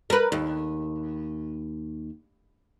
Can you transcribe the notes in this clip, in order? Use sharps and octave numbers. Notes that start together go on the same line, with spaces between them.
A#4 B4
D#2